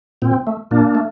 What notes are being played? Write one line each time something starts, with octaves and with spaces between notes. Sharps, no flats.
A#2 C4
A3
A#2 A#3 D4
A3